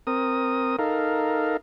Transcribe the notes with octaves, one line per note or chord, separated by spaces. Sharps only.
C4 A#4 D#6
D#4 A4 A#4 F5